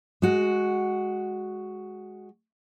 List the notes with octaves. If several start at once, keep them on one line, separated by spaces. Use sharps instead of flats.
G#3 F#4